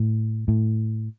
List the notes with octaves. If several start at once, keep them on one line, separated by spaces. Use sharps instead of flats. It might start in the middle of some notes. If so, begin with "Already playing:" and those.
Already playing: A2
A2